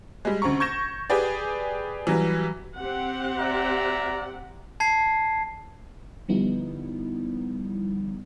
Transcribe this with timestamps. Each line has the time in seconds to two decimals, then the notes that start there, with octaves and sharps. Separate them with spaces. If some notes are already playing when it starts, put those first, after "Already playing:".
0.25 G3 G#3
0.42 D2 C#3 C4 A#5 C#6
0.60 C#6 G6 G#6 A#6 E7
1.10 G4 G#4 B4 D5
2.07 E3 F#3 G3
2.78 C4 G4 F#5
3.38 D5 E5 A#5
4.80 A5 G#6 C7
6.28 D3 F3 G3 B3 D#4 E4